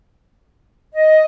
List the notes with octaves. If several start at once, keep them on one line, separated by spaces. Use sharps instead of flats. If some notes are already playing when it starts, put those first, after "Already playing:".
D#5